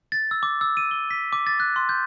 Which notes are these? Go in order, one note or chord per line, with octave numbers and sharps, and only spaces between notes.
A6
E6
D6
E6
D#7
G7
B6
D6
A6
F#6
C6
G6